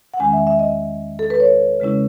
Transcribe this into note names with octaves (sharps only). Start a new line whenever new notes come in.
F#5
E2 D#3 G#3 C#4 G#5
E5
E5
D#5
A4
B4
C#5
C#3 G#3 C#4 E4